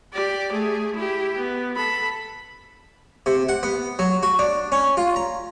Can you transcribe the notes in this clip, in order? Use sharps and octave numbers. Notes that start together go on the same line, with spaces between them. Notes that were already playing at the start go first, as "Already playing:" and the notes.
G4 D5
A3 G#4
E4 G4
B3
A4 B5
C3
F#5
B3
F#3
F#4
D4
C#4
F4
A#5